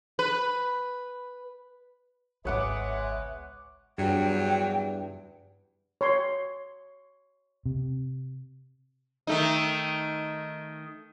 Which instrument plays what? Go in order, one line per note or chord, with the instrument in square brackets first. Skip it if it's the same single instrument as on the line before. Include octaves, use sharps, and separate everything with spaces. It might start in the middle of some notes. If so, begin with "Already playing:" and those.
[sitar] B4
[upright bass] G#1 C#2 [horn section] G#3 B3 [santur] C#5 F#5 D6 [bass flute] E5
[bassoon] E2 [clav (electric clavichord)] G2 [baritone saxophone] F#3 [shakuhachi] G5
[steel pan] C#5 C6
[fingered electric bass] C3
[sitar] D#3 A3 D#4